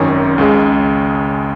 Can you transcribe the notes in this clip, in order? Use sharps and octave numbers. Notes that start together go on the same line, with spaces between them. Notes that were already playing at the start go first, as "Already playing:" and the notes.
Already playing: G#1 F#2 D#3 C#4
C#2 C#3 G#3